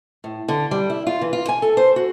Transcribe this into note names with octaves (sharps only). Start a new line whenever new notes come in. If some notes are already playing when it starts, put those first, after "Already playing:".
A2
D3
G3
E4
F4
E3
F4
G#5
A4
C5
F#4